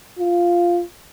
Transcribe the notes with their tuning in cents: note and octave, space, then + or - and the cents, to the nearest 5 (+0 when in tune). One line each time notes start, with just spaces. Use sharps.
F4 -5